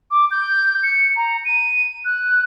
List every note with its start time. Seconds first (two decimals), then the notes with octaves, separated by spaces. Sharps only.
0.11 D6
0.31 G6
0.83 C#7
1.16 A#5
1.45 D#7
2.05 F#6